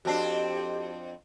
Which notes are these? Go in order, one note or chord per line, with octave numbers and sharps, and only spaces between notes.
F2 C4 D4 F#4 G4 A5 C7